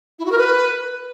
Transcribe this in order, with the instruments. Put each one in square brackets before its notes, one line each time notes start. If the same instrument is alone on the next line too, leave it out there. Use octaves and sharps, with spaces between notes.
[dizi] E4
F#4
A#4
B4